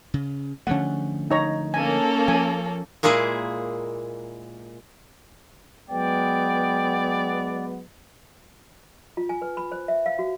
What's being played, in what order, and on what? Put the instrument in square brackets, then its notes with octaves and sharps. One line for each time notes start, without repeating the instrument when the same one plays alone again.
[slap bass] C#3
[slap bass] D3 F3 A3 [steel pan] C#4 F#5
[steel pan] D#4 C#5 A#5
[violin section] A#3 C#4 A4 [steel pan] G#5
[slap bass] F3 [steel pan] G#5
[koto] A#2 G#3 A#3 E4 G#4
[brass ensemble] F#3 G#3 B3 [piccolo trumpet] D5 [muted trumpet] G5
[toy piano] F4
G#5
B4
B5
C5
E5
F5
F#4